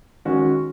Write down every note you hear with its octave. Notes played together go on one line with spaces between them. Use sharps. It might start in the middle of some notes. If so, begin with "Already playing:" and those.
D#3 G#3 C#4 F#4